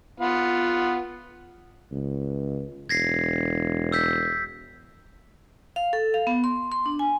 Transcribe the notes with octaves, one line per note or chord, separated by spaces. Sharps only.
B3 F4 F#5
C#2
E1 G#6 A#6 C7
E6 G6 B6
F5
A4
F5
B3
C6
C6
D4
G#5